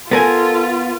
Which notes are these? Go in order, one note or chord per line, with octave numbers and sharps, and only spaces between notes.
B3 F4 A4 A#4 G#5